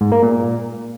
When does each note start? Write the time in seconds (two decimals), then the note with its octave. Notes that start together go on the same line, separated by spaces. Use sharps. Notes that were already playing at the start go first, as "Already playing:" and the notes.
0.01 G#2
0.12 A#3
0.23 A#2